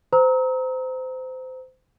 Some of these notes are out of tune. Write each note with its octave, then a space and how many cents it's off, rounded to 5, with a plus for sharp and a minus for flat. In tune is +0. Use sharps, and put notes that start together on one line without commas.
C5 -25 A#5 +0 E6 -45